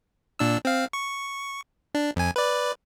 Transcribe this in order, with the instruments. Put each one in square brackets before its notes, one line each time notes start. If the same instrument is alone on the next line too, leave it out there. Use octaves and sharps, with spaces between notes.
[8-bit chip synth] A#2 D4 E6
C4 F5
C#6
D4
F2 G#5
B4 D5